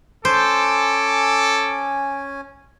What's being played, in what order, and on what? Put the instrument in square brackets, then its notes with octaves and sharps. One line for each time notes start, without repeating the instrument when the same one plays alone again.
[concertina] C#4 G#5 [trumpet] A4 [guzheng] C5 [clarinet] D6